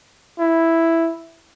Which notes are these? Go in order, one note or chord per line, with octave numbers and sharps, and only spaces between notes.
E4